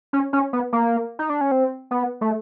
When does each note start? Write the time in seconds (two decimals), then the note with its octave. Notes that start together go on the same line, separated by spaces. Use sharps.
0.13 C#4
0.33 C#4
0.53 B3
0.73 A#3
1.19 D#4
1.30 D4
1.41 C#4
1.52 C4
1.91 B3
2.21 A3